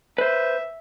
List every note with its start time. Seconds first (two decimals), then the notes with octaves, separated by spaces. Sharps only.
0.18 B4 C5 E5